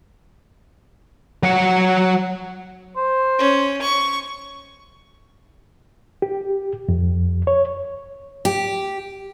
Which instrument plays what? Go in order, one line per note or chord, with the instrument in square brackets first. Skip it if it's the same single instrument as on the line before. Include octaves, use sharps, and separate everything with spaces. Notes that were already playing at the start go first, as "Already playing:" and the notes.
[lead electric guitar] F#3 F#5
[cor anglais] C5
[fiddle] C#4
C#6
[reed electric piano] G4
F2
C#5
[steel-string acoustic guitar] G4